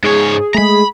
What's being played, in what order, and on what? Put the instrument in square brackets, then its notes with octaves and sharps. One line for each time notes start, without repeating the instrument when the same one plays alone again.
[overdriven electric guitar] G#2 C#5 [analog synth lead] G#4
[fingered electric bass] G#3 A3 [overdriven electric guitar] A#5 B5